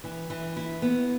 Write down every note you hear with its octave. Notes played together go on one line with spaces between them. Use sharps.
E3
E3
E4
B3